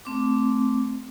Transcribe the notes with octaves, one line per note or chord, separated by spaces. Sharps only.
A3 C4 D6